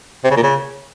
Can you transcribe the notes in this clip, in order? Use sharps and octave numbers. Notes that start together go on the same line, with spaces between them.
C3
C#3
A#2
C#3